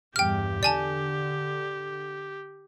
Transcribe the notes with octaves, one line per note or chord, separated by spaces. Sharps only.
E2 G2 G4 G5 F6
D3 D5 G#5 A5